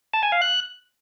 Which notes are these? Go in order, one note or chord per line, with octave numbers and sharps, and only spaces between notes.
A5
G#5
F5
F#6